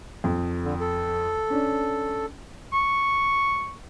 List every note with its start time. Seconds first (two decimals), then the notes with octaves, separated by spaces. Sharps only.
0.24 F2
0.64 D3
0.81 A4
1.50 C#4 D4
2.73 C#6